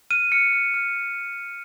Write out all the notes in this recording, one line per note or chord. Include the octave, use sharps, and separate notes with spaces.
F6 D#7
F6 C#7
F6
F6